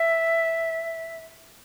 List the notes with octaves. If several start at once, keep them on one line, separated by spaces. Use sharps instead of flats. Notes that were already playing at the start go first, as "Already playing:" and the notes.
Already playing: E5